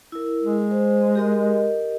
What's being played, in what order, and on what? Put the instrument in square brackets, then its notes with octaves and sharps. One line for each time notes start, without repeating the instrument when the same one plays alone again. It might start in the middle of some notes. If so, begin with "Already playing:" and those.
[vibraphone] E4 A#4
[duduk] G#3
[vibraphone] C5
G4 A#4 D#5